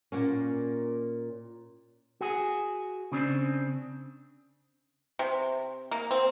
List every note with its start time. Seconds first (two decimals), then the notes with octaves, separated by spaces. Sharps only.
0.12 A#2 A#3 C#4
2.21 F#4 G#4
3.12 C#3 C4 D4
5.19 C3
5.91 A#3
6.11 C4